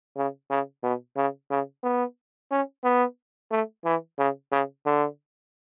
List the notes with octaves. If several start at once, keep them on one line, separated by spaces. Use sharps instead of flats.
C#3
C#3
B2
C#3
C#3
B3
C#4
B3
A3
E3
C#3
C#3
D3